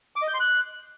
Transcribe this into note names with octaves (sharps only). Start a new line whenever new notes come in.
D6
D#5
G6
C6
F#6